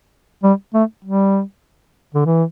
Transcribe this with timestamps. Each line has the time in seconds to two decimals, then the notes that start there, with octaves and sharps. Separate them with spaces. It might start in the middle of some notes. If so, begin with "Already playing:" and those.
0.43 G3
0.74 A3
1.04 G3
2.14 D3
2.25 E3